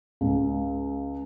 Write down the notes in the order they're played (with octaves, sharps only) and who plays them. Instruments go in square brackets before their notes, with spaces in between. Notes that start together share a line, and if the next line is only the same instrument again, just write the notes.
[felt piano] C#2